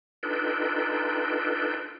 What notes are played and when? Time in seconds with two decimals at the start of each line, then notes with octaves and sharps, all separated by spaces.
0.23 D4 D#4 F4 A4 B4 G5